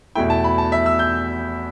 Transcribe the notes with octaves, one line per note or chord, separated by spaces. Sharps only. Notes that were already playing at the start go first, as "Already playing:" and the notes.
E2 B2 A3 E4 G5
A5
B5
A5
E5
E6
G6